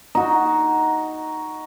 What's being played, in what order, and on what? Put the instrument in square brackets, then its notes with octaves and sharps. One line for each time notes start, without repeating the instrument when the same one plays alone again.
[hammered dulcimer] D#4 F#4